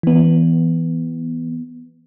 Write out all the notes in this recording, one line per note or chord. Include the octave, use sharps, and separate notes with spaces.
E3 B3